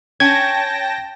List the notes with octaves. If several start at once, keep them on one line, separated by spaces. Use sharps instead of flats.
C#4 G5 A5 G#6 A#6